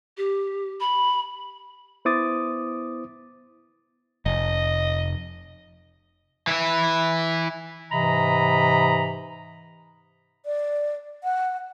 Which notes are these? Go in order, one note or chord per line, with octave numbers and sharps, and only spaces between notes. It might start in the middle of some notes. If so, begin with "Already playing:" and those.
G4
B5
B3 E4 C5 D6 D#6 A6
F1 D#5
E3 E4
G#2 C3 E3 D#5 A#5 B5
D5
F#5